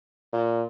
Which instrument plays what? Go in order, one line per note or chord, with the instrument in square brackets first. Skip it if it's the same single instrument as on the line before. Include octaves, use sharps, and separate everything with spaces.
[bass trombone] A#2